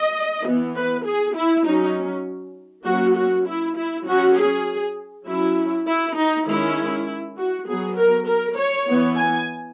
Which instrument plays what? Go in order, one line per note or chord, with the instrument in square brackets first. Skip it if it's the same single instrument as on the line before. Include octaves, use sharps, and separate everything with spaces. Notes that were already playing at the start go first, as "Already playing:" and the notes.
Already playing: [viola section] D#5
E3 B3
B4
G#4
E4
F#3 C#4 D#4
F#3 A#3 C#4 F#4
F#4
E4
E4
F#3 C#4 F#4
G#4
F#3 C#4 E4
E4
D#4
D#3 G#3 C#4 E4
F#4
F#3 B3 G#4
A#4
A#4
C#5
E3 B3
G#5